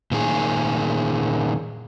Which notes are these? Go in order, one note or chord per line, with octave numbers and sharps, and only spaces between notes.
A#2 D#3 G#4